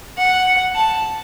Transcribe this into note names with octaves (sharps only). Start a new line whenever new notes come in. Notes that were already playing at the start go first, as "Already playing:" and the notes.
F#5
A5